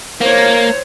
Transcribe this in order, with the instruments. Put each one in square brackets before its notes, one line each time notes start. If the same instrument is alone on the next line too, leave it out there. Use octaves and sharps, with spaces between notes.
[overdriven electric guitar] A#3 [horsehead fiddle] C5 C#5